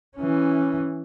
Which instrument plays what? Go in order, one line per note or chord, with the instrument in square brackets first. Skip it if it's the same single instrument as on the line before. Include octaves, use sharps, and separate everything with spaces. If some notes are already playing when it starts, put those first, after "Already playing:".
[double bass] E3 C#4